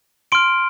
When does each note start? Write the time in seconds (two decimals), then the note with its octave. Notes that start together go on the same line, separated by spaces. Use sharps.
0.32 C6 F6 D7